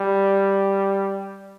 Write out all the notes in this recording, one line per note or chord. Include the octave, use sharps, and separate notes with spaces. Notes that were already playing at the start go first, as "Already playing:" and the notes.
Already playing: G3